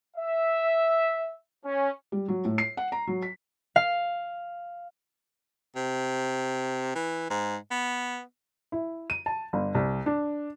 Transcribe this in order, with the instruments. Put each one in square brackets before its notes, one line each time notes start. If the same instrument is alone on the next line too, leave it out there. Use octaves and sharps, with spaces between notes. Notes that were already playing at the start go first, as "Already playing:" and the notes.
[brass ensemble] E5
C#4
[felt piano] G3
F#3
A2
C7
F#5
A#5
F#3
B6
[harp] F5
[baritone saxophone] C3
E3
G#2
B3
[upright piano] E4
D#7
A5
G1
C2
D4